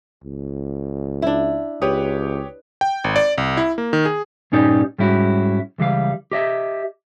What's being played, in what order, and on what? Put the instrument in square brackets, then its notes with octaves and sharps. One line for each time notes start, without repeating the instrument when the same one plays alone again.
[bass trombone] C#2
[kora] D4 E4
[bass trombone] C#2 [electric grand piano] G4 C#5 D#6 [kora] B4
[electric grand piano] G5
G#1
D5
C2
E4
A#3
D#3
G#4
[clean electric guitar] G2 A#2 C#4 D#4 G4 D5
G#2 G3 C#4 E4 F#4
C#2 E3 G3 F5
G4 D#5 E5